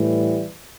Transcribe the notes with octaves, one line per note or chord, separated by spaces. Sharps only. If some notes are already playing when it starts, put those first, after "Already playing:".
Already playing: A2 E3 G3